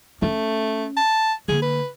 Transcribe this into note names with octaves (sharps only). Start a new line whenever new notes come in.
A3 C#4
A5
D3 A#3 G#4
B4